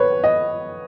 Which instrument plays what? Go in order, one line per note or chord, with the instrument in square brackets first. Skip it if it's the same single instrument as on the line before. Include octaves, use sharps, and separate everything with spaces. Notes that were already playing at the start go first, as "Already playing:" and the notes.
Already playing: [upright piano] B4 C#5
D#5